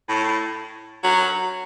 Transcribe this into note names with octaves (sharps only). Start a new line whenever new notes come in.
A2
F#3